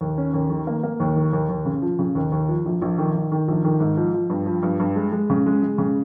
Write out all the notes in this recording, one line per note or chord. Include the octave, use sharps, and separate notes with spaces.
D#2
C#4
D#2
D#3
A#3
A#3
D#2
D#3
D#2
D#2
C#3
F3
C#3
D#2
D#2
F3
A#1
A#1
D#3
D#3
D#3
A#1
D#3
G#2
F3
F3
G2
F3
G2
G2
G#3
G#3
C#3
G#3
G#3
C#3